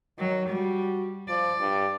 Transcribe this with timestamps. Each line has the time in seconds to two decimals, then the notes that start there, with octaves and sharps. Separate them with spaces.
0.19 D#3 F#3
0.49 G3 F#4
1.29 F3 D5
1.60 G2